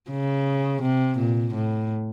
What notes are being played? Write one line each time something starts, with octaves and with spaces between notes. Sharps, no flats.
C#3
C3
A#2
A2